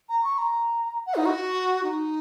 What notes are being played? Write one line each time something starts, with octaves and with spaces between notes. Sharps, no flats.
A#5
C#6
A#5
F#5
D#4
F#4
D#4